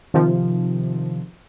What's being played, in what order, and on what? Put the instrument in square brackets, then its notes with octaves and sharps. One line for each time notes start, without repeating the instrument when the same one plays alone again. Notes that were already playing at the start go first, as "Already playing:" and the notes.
[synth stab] C3 D#3 F3